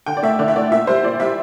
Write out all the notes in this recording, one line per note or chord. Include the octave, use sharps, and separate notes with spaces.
D3 G5
D5
A3 E5
D3 D5
E5
A3 D5
A#2 E5
G3 C5
A#2 D5
G3 E5